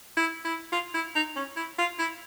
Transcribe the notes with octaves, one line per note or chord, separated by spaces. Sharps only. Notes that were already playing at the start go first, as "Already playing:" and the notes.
E4
E4
F4
E4
D#4
C#4
E4
F4
E4